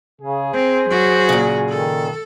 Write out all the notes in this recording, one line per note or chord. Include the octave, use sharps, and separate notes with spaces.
C#3 G#4
C4 C5
F#3 F#4
A#2 C#3
D#3 A4